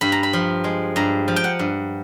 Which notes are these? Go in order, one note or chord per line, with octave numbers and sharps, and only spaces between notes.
G2 B5
A#5
B5
F3
G#3
G2 A#5
F3
G5
F#5
G2